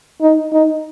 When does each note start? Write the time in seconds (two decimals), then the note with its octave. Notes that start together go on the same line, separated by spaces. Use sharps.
0.22 D#4
0.53 D#4